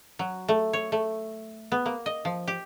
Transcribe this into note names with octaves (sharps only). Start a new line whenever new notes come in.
F#3
A3
C#5
A3
B3
A#3
D#5
F3
G4